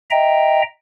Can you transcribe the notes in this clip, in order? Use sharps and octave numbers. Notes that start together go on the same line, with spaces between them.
D#5 E5 G5 A#5